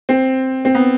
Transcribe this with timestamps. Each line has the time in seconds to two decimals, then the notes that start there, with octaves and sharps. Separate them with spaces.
0.09 C4
0.65 C4
0.75 B3